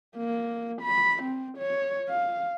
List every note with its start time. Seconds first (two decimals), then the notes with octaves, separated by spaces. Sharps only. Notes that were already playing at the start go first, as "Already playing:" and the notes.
0.17 A#3
0.82 B5
1.23 C4
1.58 C#5
2.09 F5